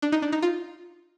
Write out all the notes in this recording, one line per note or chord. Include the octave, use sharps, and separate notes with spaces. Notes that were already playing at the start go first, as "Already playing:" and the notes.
D4
D#4
D4
D#4
F4